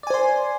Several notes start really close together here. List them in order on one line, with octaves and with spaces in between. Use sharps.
D5 G#5 C5 C6